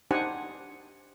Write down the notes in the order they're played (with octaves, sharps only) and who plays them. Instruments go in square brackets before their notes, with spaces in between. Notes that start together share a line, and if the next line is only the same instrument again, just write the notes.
[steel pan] D4 D#4 G4 C5 F#5 G#5